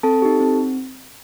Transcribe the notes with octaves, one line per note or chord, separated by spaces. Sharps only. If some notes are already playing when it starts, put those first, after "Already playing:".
C4 A4 A5
D#4 G4
C4